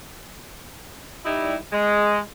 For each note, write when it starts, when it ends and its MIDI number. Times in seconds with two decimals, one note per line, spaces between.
1.25 1.55 55
1.25 1.55 63
1.25 1.55 64
1.73 2.19 56